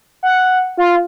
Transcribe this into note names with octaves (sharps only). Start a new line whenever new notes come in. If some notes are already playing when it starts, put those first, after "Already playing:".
F#5
F4